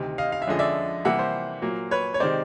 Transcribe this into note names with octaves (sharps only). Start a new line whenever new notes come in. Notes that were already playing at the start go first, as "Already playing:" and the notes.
Already playing: D2 C3 D#3
D#5 F5
F5
E5
F2 D3 F3 G#3 C#4 D#5
D5 E5
C3 E3 G3 A#3 E5 F#5
C5
A#2 F#3 A#3
B4 C#5
C#5
C3 D#3 G#3 C4 C5 D5